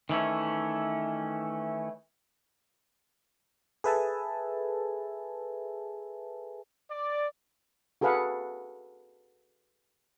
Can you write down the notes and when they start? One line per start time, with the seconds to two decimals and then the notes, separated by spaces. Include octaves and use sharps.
0.09 D#3 E3 A3 C#4
3.84 G#4 A4 B4 E5 G#5 A5
6.89 D5
8.01 F#4 G#4 A4 B4 F5 F#5